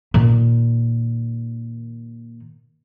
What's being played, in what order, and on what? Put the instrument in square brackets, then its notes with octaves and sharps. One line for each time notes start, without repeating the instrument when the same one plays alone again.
[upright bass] A#2 D#3